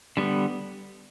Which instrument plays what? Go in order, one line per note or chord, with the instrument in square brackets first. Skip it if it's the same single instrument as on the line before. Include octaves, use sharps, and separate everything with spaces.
[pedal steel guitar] D3 G3 B3